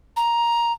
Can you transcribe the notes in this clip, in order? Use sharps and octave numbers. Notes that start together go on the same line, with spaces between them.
A#5